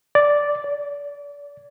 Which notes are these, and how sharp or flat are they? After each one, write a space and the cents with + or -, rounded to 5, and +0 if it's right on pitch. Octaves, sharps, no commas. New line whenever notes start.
D5 -5
D5 -35